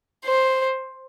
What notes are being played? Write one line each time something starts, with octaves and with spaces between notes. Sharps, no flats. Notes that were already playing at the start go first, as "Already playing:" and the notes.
C5